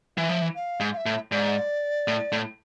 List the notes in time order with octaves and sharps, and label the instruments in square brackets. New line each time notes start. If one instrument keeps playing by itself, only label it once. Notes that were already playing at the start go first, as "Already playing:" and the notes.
[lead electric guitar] E3 [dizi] E5
[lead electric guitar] F3
E3
[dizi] F5
[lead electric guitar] G#2
[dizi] F5
E5
[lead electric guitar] A2
[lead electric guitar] G#2 [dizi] D5
[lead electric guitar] A2
A2